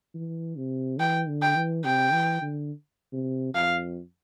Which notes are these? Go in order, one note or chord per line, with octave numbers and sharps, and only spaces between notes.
E3
C3
E3 G5
D3
G5
E3
C3 G5
E3
D3
C3
F2 F5